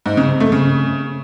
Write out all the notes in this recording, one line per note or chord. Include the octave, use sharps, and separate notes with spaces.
G#2
C#3
C3
A3
C#3